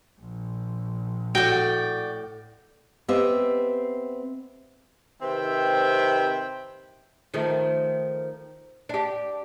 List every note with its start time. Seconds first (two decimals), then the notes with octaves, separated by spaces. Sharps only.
0.20 A#1
1.35 A2 F#4 D5 G5
3.08 B3 C4 G4 D#5 E5
5.22 C3 D#3 C4 B4 E5 G5
7.34 D#3 F3 A3
8.89 D4 G4